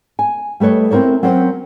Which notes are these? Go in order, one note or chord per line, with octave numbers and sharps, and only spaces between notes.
G#5
G3 A3 B4 C#5 D#5
C4 E4 A#4 C5 C#5
F#3 C4 C#4 A#4 C5